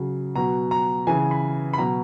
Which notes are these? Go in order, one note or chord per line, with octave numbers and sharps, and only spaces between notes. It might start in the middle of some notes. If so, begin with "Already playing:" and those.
Already playing: C#3 F#3
B2 F#3 A#5
A#5
C#3 E3 G#5
B5
B5
B2 F#3 A#5